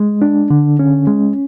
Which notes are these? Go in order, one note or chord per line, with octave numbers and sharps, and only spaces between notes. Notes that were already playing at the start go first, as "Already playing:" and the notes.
Already playing: G#3
D4
D3
C#4
G#3